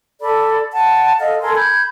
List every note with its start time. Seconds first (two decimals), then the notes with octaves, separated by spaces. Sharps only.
0.21 A4 D5 B5
0.72 F#5 A5
1.20 A4 D#5 F5
1.41 A4 A#4 G#5 C6
1.56 B5 G6 G#6